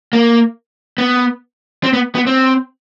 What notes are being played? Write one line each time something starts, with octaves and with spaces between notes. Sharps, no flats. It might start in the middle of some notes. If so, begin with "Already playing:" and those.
A#3
B3
C4
B3
B3
C4